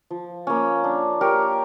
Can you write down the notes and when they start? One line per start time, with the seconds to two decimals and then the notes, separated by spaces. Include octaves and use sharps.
0.10 F3
0.47 A#3 C#4
0.84 D4
1.21 G4 A#4 C#5